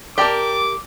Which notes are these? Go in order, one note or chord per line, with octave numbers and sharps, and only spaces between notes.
G4 A#4 D5 G5 A5 D6